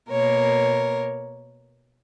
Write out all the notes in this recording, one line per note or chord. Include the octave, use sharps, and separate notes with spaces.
B2 A#3 A#4 C#5